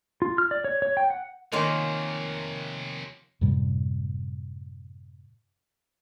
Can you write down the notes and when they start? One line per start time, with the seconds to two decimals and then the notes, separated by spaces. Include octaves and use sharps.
0.22 F4
0.38 F6
0.51 D5
0.64 C#5
0.82 C#5
0.97 G5
1.10 F#5
1.52 C3 D#3 F3 A#3 F4 A#4 C#5 G#5
3.41 F#2 A2 C3 G3